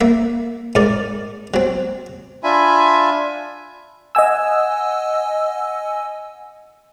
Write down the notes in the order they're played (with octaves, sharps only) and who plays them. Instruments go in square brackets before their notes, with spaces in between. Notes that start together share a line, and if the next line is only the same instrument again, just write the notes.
[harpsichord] A#3 E5
G#2 A#4 D5
F#3 C4
[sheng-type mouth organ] D4 F4 E5 G#5 B5
[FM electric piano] D#5 F#5 G#5 E6